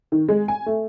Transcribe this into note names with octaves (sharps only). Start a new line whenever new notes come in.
D#3
G#3
G#5
A3